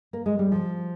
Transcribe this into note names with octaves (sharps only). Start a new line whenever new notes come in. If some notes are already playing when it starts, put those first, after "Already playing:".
A#3
G#3
G3
F3